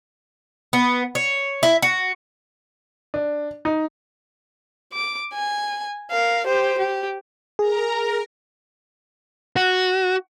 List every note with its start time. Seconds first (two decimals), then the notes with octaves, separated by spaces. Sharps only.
0.73 B3
1.15 C#5
1.63 E4
1.82 F#4
3.14 D4
3.65 D#4
4.93 D6
5.33 G#5
6.10 A#4 F5
6.46 G4 C5
6.78 G4
7.59 G#4 A#4 A#5
9.56 F#4